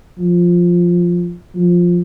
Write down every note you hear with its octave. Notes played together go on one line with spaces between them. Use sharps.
F3
F3